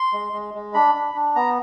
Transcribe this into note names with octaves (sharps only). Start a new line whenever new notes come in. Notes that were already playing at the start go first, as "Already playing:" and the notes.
Already playing: C6
G#3
G#3
G#3
D4 B5
D4
D4
B3 A#5